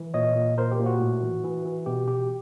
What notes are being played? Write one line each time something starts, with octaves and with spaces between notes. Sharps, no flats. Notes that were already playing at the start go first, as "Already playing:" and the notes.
Already playing: E3
A#2 C#5 D#5
A#2
A#2 A#4 C5
G4
A#2
F#4
A2
E3
E3
E3
B2 G4
B2 G4